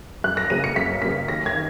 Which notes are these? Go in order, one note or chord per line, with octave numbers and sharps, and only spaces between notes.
F#2 F#6
A#6
C#3 F#3 A#3 D#7
C#7
F#2 B6
C#3 F#3 A#3 B6
D#2 A#6
G#6
D#3